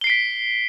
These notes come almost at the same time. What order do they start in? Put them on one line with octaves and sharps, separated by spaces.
G7 C7 D7 B6